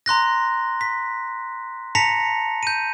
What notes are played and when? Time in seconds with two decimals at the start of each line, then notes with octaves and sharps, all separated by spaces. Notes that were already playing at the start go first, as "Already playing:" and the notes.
0.06 A#5 C6 F#6 A#6
0.81 B6
1.95 A5 A#5 A#6 B6 C#7 F7
2.63 G6 D#7